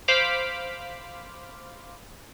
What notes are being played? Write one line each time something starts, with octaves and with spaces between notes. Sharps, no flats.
C5 F5 B5 D6 F6 B6